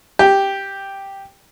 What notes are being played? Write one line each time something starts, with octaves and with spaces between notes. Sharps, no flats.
G4